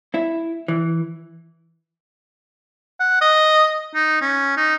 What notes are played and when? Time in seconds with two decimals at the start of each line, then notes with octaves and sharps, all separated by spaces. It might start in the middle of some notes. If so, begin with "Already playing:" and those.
0.14 E4
0.68 E3
3.00 F#5
3.21 D#5
3.95 D#4
4.21 C#4
4.57 D#4